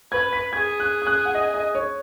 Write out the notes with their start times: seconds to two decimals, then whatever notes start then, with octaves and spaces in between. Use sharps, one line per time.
0.12 B4 G#6
0.33 B6
0.53 G#4 G#6
0.80 F#6
1.02 D#6
1.07 F#6
1.25 F#5
1.35 D#5
1.54 D#5
1.75 C#5